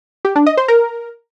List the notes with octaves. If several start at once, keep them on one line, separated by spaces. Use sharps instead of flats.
G4
D4
D#5
C5
A#4